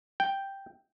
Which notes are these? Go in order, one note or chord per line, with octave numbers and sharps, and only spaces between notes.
G5